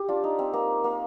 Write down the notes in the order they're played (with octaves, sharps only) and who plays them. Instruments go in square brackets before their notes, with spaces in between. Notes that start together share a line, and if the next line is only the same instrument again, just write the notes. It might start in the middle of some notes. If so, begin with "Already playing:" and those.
Already playing: [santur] G4
D4 F4
D#4
C4
A#3
A#3